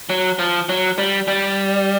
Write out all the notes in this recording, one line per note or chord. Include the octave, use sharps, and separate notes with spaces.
F#3
F3
F#3
G3
G3